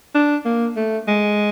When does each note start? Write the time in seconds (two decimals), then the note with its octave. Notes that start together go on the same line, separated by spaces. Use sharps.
0.15 D4
0.45 A#3
0.77 A3
1.08 G#3